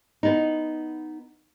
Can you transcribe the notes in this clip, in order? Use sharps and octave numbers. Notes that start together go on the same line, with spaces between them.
B3 D#4